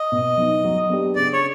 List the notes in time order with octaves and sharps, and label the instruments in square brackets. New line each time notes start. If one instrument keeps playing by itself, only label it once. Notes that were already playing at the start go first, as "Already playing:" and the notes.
Already playing: [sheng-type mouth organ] D#5
[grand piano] B2
F#3 B3 D#4
F#3
B3 D4 G4
[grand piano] C#3 [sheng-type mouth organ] D5
[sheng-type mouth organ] C#5